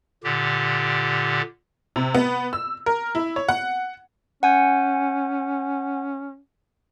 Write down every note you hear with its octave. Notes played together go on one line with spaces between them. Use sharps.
A#2 D3 G4
C3
B3
E6
A#4
E4
C#5
F#5
C#4 F#5 G#5 G6